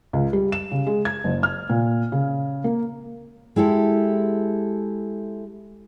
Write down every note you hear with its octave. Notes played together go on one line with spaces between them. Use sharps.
C#2
G3
E7
C#3
G#3
G#6
F#1
F6
A#2
C#3
A#3
G#3 E4 G4 A4